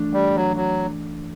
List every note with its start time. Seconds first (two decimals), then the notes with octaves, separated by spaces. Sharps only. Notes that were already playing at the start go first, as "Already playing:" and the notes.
Already playing: E3 A3 D4
0.13 G3
0.36 F#3
0.56 F#3